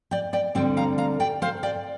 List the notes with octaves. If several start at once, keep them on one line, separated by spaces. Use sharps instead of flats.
D5 G5
D5 G5
D2 D3 G3 C4 D5 G5
F5 A#5
F5 A#5
D5 G5
C5 F5
D5 G5